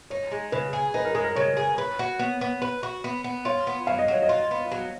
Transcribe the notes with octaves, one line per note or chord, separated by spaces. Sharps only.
D#4 C#5
G#3
C#3 B4
G#4
D#4 B4
A#4
G#3 G#4
A#4
C#3 C#5
G#4
B4
F#4
B3
B3
B4
F#4
B3
B3
F4 C#5
B3
F#3 F5
D#5
F#3 C#5
D#5
F4
B3
F#3